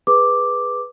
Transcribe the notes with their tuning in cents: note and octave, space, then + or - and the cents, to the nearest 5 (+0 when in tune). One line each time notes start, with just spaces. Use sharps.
G#4 +0 B4 +0 D6 +0